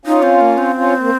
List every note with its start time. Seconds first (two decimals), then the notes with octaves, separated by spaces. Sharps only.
0.05 C#4 D#4 F4
0.23 C4
0.41 A#3
0.58 C4
0.75 C#4 F4
1.00 A#3